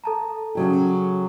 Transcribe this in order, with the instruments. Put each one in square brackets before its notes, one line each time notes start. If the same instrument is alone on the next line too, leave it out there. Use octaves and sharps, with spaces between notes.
[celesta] A4 A5 A#5
[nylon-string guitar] C#3 F#3 G4